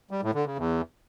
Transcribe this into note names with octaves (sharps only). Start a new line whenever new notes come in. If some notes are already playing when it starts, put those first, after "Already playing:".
G3
A2
D3
C#3
E2